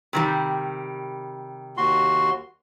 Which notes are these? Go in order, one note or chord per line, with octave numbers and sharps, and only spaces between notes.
C3 D#3 G3
D#2 F#4 C6